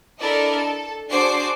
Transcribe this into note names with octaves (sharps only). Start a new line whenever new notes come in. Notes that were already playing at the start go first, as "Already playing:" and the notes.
D4 E4 A4 A#4 D5 D#5
A4
D4 F#4 G#4 C5 D6 C7